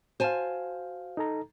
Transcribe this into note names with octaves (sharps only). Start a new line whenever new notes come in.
F#4 C5 F5 G#5 A5
D#4 A4 A#5